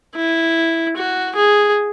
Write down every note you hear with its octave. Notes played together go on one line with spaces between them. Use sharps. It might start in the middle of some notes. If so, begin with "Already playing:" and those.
E4
F#4
G#4